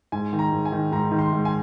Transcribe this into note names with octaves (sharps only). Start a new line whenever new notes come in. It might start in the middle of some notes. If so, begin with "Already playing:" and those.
G#2 G#5
D#3
A#5
G#2
G#5
D#3
G#2 A#5
D#3
C6
G#2
G#5